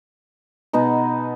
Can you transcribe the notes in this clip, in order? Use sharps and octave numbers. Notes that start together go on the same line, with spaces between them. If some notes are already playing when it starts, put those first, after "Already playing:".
B2 B3 D#4